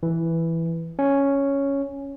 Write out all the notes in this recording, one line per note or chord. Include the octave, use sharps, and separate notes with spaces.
E3
C#4